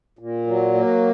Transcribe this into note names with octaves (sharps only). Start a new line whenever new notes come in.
A#2
F#3
A#3